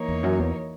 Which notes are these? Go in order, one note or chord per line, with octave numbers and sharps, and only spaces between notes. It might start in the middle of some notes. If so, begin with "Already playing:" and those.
Already playing: E3 A#3 D#4 A#4 C#5
E2
F#2
E2